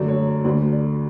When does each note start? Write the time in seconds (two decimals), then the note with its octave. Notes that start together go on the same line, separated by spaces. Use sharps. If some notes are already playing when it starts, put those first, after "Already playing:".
Already playing: F#2 D3 F#3 A3 D5
0.08 C#5
0.26 C#5
0.44 D2 D3 A3 D5
0.72 D5